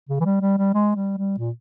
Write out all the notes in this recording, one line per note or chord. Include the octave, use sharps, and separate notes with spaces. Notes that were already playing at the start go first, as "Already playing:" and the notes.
C#3
E3
G3
G3
G3
G#3
G3
G3
A#2